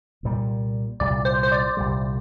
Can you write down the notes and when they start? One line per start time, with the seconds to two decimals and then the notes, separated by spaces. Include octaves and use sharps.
0.23 C2 A#2 G3
1.00 C2 A#2 G3 D5
1.25 C5
1.43 C5
1.52 D5
1.77 C2 A#2 G3